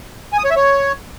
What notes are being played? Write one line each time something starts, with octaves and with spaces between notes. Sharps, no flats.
G#5
D#6
C#5
E5
C#5